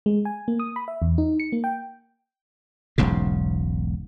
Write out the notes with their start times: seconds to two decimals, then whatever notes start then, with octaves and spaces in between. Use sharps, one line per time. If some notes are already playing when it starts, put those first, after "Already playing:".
0.06 G#3
0.25 G#5
0.48 A#3
0.60 D#6
0.76 B5
0.88 E5
1.02 E2
1.18 D#4
1.40 C#7
1.52 A#3
1.64 G5
2.98 E1 B1 G#2 C#3